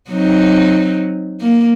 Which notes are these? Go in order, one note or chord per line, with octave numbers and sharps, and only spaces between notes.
F#3 C4 D#4
A#3